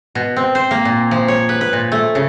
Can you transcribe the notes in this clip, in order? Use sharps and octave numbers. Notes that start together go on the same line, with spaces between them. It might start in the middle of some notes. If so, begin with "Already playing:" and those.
B2
C4
C5
A#3
A#2
F3
C#5
B4
B4
A#2
A3
C#3